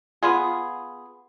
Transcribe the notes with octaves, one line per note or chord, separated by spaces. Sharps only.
B3 F4 G#4